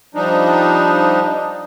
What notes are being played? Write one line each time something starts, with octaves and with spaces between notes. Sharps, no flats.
F3 G3 D4 D#4